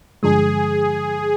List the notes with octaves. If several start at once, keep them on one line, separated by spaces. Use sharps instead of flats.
G2 D3 F3 G#3 G#4